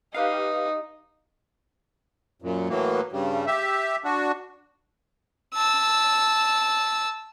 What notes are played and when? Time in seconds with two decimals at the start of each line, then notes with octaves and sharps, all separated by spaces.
0.14 D#4 G4 B4 F5
2.42 F#2 A#2
2.69 A2 E3 F#3 A#3
3.12 G2 C#3 G3
3.46 G4 E5
4.04 D4 F#4
5.55 A5 E6